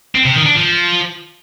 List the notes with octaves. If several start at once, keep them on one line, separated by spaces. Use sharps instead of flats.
C4
C3
D#3
D4
F3